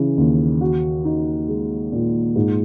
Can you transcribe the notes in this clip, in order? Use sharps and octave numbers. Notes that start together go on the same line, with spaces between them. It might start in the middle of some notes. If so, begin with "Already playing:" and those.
Already playing: C#3 E3
D#2
F#4
D#4
G#3
A#2
G#2